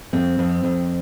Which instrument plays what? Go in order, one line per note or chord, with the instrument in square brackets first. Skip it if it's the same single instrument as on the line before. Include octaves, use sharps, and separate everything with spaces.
[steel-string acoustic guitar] F2 C4
F2
F2